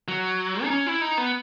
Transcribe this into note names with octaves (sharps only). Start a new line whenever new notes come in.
F#3
D#4
C#4
E4
D#4
B3